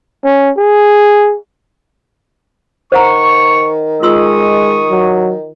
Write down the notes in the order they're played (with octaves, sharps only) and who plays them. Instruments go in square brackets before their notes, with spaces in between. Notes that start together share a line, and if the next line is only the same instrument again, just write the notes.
[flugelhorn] C#4
G#4
[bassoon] D#3 [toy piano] C5 F#5 A#5 [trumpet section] C#6
[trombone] G#3 [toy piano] F4 C6 E6 [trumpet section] C#6 D#6
[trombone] F#3